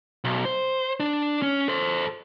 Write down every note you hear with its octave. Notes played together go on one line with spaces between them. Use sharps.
B1
C5
D4
C#4
A4 C5